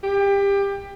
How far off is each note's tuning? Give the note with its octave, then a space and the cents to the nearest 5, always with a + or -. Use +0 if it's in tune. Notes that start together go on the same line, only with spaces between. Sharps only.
G4 +25